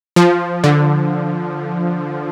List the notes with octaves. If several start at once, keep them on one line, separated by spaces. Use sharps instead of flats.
F3
D3